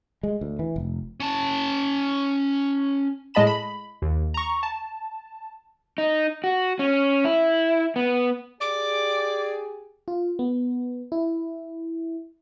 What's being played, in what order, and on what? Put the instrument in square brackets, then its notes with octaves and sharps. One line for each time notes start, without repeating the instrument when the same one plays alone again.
[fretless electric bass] G#3
D2
E3
F1
[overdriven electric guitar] C#4 A5
[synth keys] A2 G#3 D#5 A5 B5 E7
B5
D#2
A#5 C#6
A5
[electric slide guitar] D#4
F#4
C#4
E4
B3
[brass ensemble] G4 G#4 [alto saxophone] D5 [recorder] D6
[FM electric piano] F4
B3
E4